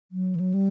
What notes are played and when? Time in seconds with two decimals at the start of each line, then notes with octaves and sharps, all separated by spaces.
0.12 F#3
0.35 E3
0.40 F#3
0.54 G3